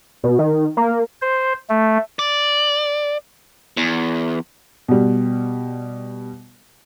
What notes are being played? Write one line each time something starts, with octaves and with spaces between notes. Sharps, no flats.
B2
D#3
A#3
C5
A3
D5
E2
B2 G3